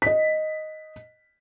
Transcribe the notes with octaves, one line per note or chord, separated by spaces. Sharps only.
D#5 B6